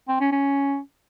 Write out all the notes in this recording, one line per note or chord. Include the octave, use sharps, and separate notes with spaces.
C4
C#4
C#4